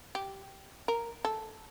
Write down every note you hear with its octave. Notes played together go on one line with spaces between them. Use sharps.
G4
A#4
A4